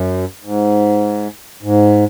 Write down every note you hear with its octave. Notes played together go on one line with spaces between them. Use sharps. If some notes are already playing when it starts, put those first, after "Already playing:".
Already playing: F#2
G#2
G#2